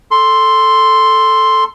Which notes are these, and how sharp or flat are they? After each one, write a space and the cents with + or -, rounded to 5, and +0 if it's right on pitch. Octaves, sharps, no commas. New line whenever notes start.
A4 +0 C6 +0